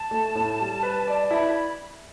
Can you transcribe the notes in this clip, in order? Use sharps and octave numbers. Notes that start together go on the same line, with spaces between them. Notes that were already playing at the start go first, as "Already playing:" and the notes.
Already playing: A5
A3
A2
G3
B4
D5
E4 B5